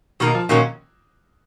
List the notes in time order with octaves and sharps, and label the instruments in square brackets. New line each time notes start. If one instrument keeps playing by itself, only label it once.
[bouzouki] B2 A#3 D#4 A#4 [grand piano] D#3
[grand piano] F3
[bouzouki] A#2 F#3 A#3 C#4 [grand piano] D#3